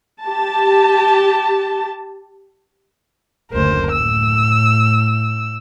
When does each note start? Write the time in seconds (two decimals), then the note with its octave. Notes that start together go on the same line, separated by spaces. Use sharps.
0.24 G4 A5
3.51 F#1 D2 A#4 C5
3.91 A2 E6